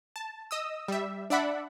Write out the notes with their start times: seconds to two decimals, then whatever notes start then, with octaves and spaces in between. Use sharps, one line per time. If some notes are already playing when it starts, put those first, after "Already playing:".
0.16 A5
0.51 D#5 D#6 E6
0.88 G3 E5
1.30 D4 D5 E5 F#5 B5